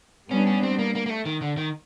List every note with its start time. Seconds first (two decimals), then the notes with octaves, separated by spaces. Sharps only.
0.31 G3 B3 C#4 D4
0.47 C#4
0.63 C4
0.79 A#3
0.95 A#3
1.06 A#3
1.10 A3
1.26 D#3
1.42 D3
1.57 D#3